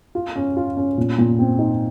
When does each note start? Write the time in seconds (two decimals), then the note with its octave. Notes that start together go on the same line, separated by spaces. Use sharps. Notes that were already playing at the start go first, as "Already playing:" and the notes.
0.15 F4
0.36 C#4
0.56 F4
0.77 C#4
0.98 A#2
1.18 A#2
1.39 C4
1.59 D#4